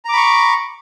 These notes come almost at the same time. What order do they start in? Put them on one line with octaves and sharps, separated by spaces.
A#5 D6 B5 C#6